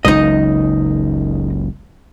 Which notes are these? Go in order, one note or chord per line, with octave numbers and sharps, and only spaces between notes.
F#1 C#2 F#2 D#4 D#5